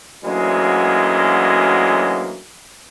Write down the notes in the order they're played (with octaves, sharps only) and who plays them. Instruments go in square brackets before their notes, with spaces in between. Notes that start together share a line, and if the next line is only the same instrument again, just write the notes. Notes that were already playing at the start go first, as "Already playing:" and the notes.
[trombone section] D2 E3 F#3 G#3 A#3 C#4